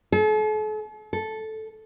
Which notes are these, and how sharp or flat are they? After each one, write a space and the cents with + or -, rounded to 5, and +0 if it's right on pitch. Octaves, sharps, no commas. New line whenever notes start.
A4 -45
A4 -5